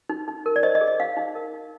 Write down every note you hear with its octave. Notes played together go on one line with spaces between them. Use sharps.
D#4
D#4
A#4
D5
C5 D#5
D#5
G#4
D#5
D#4 F5
D#4
A#4
D#4